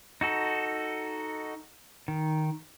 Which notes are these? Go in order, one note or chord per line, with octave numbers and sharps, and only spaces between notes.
D#4 F#4 A4
D#3